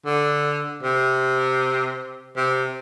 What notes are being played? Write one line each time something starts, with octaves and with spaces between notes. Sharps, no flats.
D3
C3
C3